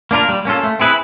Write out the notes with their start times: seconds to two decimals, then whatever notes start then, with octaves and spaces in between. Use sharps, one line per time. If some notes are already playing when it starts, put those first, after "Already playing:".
0.11 A#3 D4 F4 A#4
0.29 G3
0.45 A#3 C#4 F4 A4
0.63 A3
0.79 C4 E4 G#4 B4